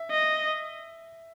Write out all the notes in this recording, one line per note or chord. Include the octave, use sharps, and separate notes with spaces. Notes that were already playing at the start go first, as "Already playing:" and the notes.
Already playing: E5
D#5